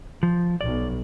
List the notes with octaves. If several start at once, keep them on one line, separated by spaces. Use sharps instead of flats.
F3
B1 D5